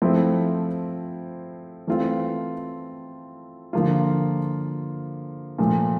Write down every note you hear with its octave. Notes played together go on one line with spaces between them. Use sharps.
F3 A3 C4 E4
E3 A3 C4 F4
D3 F3 A#3 F4
A#2 F3 A3